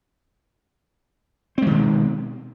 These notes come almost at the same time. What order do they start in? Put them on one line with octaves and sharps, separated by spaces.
C4 G#3 D#3 B2